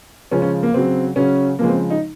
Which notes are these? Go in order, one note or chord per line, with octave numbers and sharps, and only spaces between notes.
C#3 F3 G#3 C#4
C#4
A#3
C#3 F#3 C4
C#3 F#3 C#4
C#3 F3 G#3 A#3
C4
D#4